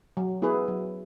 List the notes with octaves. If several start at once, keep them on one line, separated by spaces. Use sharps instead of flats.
F#3
B3 E4 G#4 B4
F#3